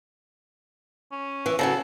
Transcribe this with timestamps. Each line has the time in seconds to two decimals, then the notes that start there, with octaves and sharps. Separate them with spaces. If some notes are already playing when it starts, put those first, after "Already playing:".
1.12 C#4
1.46 E3
1.59 C#3 F3 F#3 A4